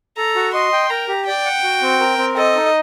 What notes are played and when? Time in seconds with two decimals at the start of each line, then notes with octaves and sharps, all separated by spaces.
0.17 A4 A#5
0.36 F#4
0.54 D#5 C6
0.73 G5
0.90 A#4 A#5
1.08 G4
1.27 D5 G5
1.45 F#5
1.63 F#4
1.82 C4
2.00 A#4
2.18 C4
2.36 A4 D#5
2.55 D#4